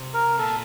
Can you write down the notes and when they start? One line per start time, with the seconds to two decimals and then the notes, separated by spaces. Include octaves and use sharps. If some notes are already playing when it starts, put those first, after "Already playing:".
Already playing: C3
0.14 A#4
0.39 A#2 A4